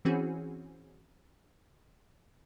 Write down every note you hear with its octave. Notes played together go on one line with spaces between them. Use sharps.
E3 C4 C#4 F#4 G#4